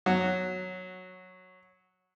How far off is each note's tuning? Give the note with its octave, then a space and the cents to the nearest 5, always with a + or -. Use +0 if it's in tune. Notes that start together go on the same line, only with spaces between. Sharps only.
F#3 -10 F#4 +0